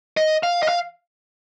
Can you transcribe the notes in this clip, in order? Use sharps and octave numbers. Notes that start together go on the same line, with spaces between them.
D#5
F5
D#5
F5